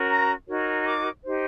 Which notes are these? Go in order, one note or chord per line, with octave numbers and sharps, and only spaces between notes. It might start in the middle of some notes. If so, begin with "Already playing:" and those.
Already playing: C#4 F#4 A#4
A#5
D#4 F#4 A#4 C#5
D6
D#4 G4 C5